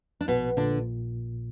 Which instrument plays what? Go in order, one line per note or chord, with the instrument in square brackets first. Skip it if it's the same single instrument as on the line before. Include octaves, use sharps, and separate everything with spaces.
[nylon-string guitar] D4
[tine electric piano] A#1 [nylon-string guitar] B2 B3
[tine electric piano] A#2 [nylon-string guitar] D3 D4